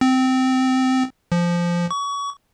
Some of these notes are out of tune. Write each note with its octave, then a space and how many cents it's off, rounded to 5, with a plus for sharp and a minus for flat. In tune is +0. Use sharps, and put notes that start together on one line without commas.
C4 -15
F3 -10
C#6 +30